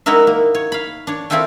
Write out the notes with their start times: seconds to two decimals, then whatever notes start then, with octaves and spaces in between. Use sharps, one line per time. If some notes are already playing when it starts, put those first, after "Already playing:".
0.06 G#3 D#4 E4 F#4 A#4 E5
0.27 A#3
0.55 C#5
0.72 F5 B5
1.07 D4 C#5
1.30 C4 E4 F4 A4 E5 G5